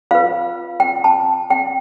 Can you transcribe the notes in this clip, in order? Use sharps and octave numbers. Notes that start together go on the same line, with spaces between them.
F4 B4 F5
G5
A5
G5